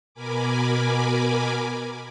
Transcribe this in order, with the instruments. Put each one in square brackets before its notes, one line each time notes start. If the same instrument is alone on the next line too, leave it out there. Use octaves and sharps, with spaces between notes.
[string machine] B2 A#4 G#5 B5 D6